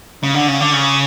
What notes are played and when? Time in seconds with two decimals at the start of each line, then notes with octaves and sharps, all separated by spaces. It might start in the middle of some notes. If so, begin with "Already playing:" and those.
0.23 C#3
0.34 D3
0.48 C#3
0.60 D3
0.73 C#3